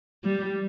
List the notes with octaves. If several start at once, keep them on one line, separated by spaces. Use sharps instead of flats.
G3